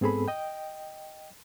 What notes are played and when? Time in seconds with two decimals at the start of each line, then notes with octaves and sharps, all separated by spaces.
0.01 G#2 B3 C4 G#4 A4 B5
0.28 D#5 G5